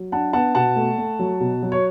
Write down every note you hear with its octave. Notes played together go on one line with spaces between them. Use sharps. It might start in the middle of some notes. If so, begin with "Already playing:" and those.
Already playing: F#3
D4 F#5 A5
B3 F#5 A5
B2 F#5 A5
A3
A3
F#3
B2
F#3
C#5